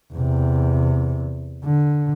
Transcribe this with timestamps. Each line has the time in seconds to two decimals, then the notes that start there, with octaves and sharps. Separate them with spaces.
0.14 E2 C3
1.65 D3